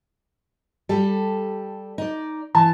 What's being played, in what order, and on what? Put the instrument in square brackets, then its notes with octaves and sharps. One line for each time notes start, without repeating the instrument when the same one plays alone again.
[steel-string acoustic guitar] G3 G4 A4
D#4 D5
[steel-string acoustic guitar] E3 [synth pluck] A5